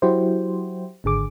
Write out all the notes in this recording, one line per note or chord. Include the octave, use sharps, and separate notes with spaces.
F#3 E4 F#4 G4 C5
G#1 D3 G#4 D6